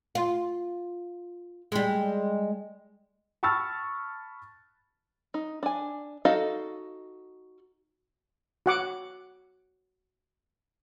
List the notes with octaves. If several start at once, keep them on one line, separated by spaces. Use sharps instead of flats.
F4
G3 G#3
A5 B5 C#6 E6 F6 A6
D#4
D4 G#5
D#4 F#4 A4 D#5 F5
F#4 F#5 D6